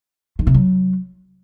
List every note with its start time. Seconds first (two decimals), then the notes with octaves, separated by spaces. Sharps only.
0.39 D#3
0.47 C3
0.54 F#3